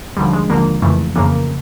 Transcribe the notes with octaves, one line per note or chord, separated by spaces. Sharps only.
D#2 D3 F3 G3
G#3
D#2 D3 F3 A#3
F2 C#3 E3 A3
F2 C#3 E3 A#3